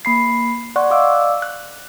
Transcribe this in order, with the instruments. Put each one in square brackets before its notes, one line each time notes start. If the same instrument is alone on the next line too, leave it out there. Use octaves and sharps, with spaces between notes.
[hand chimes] A#3 B5 C7
D5 F#5 C6 C#6 F#6
D5 D#5 F5 D6 E6
F#6